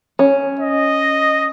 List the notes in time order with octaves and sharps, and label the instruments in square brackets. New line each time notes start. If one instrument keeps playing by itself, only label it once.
[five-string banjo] C#4
[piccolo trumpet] D#5